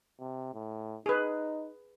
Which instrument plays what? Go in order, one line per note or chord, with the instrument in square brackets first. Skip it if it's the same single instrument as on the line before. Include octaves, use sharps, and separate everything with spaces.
[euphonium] C3
A2
[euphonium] D#4 [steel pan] G#4 B4